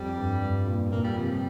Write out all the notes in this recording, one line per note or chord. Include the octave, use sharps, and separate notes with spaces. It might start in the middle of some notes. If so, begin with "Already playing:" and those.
Already playing: F2 G3
G2
G2
A#2
A#2 A#3
G3
C3 F3
G3